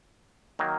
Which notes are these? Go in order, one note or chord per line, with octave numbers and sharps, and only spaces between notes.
D#3 F#3 A#3